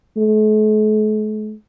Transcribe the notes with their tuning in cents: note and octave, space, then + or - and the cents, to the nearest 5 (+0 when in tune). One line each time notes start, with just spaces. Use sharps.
A3 -45